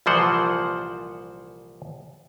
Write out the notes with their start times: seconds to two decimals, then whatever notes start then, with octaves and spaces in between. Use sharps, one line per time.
0.06 C2 A#2 E3 F3 C5 F#5